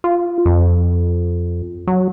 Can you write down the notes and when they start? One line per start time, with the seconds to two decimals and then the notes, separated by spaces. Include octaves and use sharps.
0.04 F4
0.45 F2
1.87 F#3